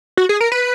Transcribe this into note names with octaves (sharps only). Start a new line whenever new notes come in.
F#4
G#4
A#4
B4